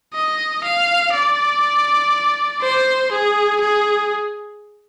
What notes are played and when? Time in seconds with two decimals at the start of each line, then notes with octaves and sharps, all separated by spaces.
0.14 D#5
0.64 F5
1.13 D5
2.62 C5
3.11 G#4
3.61 G#4